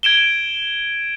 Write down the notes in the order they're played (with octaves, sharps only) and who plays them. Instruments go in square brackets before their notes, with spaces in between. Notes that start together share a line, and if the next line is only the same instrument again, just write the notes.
[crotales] G#6 D7 E7 G7